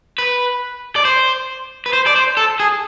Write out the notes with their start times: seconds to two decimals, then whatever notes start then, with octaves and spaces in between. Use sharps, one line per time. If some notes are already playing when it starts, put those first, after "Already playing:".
0.18 B4
0.96 D5
1.05 C5
1.86 B4
1.93 C5
2.07 D5
2.16 C5
2.37 A4
2.60 G#4